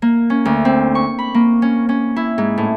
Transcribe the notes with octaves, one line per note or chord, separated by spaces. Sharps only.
A#3
C#4
D2
C4
C#6
B5
A#3
C#4
C#4
E4
G#2
A2